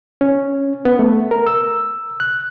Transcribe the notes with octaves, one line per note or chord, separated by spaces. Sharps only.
C#4
B3
A3
A#4
E6
F#6